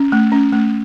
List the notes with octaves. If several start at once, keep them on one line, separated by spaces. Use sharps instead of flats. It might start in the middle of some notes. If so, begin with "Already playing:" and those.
Already playing: C#4
A3
C#4
A3